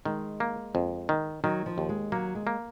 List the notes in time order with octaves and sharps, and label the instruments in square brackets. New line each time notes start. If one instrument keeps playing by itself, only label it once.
[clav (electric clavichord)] D#3 [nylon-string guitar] G#3
[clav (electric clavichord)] A#3
F2
D#3
[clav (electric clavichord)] D#3 [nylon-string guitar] F#3
[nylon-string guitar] F3
[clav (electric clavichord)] D#2
[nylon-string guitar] G#3
[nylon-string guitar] F#3 [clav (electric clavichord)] A#3
[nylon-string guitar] G#3
[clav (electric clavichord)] A#3